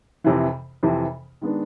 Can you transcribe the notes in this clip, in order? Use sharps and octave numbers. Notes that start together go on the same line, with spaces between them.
F2 C3 E3
F2 C3 E3
D#3 G#3 B3 D4